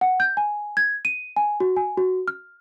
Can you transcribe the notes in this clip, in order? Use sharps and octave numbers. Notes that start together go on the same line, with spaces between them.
F#5
G6
G#5
G#6
D#7
G#5
F#4
G#5
F#4
F6